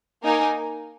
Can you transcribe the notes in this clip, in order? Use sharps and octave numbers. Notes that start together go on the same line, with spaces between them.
A#3 D#4 A#4 G#5